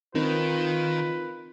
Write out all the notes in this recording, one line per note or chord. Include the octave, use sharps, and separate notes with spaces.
D#3 C4 D#4 F4 A#4 B4